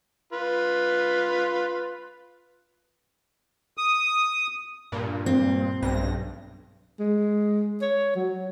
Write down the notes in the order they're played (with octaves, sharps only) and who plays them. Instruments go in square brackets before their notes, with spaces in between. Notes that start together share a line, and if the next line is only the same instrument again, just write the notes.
[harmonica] F4 B4
[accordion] D#6
[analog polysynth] G2 A#2
[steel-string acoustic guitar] C4
[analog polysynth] B1 G2 A#6
[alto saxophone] G#3
C#5
F#3